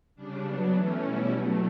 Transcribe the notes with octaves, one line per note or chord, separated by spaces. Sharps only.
C#3 G3 D4
F#3 B3 D4
E3 A3 C#4
B2 G3 C#4 E4
B2 F#3 A3